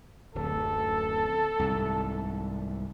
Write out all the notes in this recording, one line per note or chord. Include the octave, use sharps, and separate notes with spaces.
D1 F#2 A4
C2 G#2